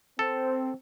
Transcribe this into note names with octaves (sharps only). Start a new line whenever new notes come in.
C4 A4